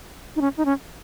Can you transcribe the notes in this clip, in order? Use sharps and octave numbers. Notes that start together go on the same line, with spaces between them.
D#4
C#4
D#4
C#4